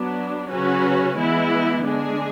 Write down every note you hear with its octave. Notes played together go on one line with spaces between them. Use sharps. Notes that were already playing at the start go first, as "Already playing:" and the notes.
Already playing: F#3 B3 D4
C#3 F#3 C#4 F#4 B4
E3 G#3 B3 E4
D3 G#3 D4 G#4